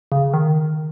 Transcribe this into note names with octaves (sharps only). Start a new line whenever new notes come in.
C#3
D#3